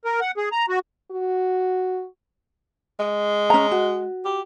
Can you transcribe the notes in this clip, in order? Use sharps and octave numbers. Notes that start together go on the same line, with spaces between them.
A#4
F#5
G#4
A#5
F#4
F#4
G#3
C#4 A#5
F#4
G4